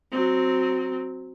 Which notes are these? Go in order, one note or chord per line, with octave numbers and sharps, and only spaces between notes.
F#3 C4